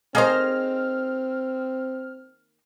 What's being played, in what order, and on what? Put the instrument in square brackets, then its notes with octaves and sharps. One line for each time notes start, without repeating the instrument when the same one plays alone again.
[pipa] D#3 A#3 D#5 [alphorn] C4 [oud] G#4 C5 [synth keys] F6